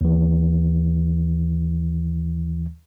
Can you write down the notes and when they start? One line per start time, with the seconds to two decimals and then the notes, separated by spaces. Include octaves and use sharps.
0.01 D#2 E3